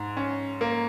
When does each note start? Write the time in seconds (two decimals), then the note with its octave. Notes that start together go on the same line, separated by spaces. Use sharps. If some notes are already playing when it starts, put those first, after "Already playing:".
Already playing: G#2
0.17 C#4
0.61 A#3